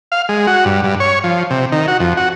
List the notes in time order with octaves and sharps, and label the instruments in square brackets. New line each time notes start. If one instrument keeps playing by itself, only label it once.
[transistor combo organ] F5
G#3
F#4
G2
G2
C#5
F3
C3
D#3
F#4
F2
F#4